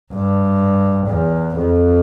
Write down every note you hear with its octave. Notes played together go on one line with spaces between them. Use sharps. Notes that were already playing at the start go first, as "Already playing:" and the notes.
G2
E2
F2